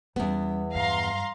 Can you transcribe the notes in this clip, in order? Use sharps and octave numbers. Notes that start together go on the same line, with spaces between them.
E2 G3 B3 C#4
G2 F#3 F5 A#5 C6